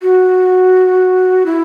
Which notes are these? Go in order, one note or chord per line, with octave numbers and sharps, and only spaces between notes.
F#4
E4